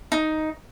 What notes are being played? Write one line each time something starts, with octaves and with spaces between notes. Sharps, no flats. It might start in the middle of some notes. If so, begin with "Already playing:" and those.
D#4